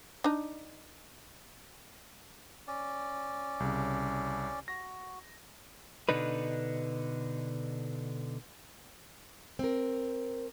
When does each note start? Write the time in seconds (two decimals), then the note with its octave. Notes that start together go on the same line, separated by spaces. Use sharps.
0.24 D4 D#4
2.68 C#4 D5
3.60 C2 C#3
4.68 F#4 A#6
6.09 B2 D3 D4 D#4 B4
9.59 C4 A#4